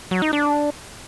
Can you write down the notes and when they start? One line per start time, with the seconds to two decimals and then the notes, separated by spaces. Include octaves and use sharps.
0.11 F#3
0.22 D#4
0.33 D4